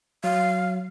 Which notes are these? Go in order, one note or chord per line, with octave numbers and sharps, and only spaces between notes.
F#3 F5